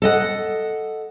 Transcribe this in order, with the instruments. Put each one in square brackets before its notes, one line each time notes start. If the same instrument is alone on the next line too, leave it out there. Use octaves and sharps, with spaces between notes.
[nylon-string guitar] A4 D#5 F#5